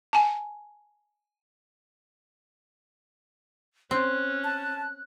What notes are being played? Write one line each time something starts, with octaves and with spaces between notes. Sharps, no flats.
G#5 A5
C4 C#4 F#6
A5